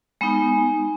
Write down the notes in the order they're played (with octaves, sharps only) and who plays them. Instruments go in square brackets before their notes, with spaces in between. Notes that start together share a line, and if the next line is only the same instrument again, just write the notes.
[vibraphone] G#3 B3 D#4